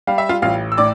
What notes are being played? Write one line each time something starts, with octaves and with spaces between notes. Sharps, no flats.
G3 F5
E5
F4 F5
A1 F4 F5
E6
A2 D5 D6